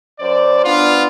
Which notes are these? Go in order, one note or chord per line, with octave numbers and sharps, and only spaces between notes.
F#2 C5 D5
B3 D4 F4